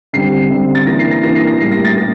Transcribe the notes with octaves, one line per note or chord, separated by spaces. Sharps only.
D3 G3 C4 C7
D3 G3 C4
A6
E3 A#3 D4 A#6
C7
A#6
E3 A#3 D4 A#6
C7
A#6
A2 G3 A#3 C7
A#6
A6
G3 A#3